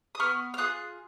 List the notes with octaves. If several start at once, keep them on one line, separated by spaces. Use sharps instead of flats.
D#6
B3 C#6 F6
F6
F4 G#4 D#6 F#6